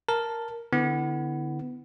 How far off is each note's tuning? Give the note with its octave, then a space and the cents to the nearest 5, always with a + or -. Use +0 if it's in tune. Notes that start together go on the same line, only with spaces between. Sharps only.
A#4 +0 A5 +0
D3 +0 B3 +20 E4 -15